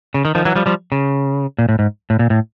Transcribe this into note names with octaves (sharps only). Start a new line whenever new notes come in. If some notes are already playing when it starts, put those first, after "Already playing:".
C#3
D#3
D#3 F3
E3 F#3
F3 G3
F3 G3
C#3
A#2
A2
G#2
A2
A#2
A2